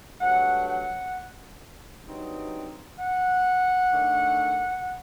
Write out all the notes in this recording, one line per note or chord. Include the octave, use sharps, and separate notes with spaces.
G2 F#3 A3 F#5
F#5
G2 F#3 C4 D#4
F#5
D#3 A3 D4